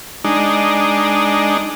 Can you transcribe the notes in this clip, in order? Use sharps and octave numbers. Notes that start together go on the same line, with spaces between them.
G#3 D4 D#4